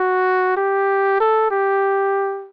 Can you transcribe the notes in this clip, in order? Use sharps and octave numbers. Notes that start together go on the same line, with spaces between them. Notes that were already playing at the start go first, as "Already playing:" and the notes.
Already playing: F#4
G4
A4
G4